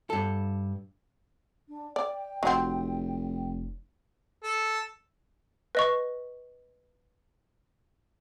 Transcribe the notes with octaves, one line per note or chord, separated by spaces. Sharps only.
G2 A4
D4
D5 G5
F1 F#3 C4
A4
B4 D#5 C#6